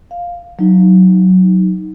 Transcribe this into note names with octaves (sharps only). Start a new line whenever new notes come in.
F5
F#3 D#4